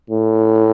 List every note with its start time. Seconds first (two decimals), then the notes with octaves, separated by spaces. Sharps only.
0.11 A2